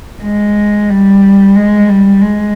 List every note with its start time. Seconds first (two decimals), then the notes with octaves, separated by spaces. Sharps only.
0.24 G#3
0.89 G3
1.55 G#3
1.89 G3
2.21 G#3